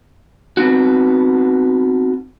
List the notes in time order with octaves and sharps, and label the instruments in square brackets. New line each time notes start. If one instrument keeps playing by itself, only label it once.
[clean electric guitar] B3 C4 D#4 F#4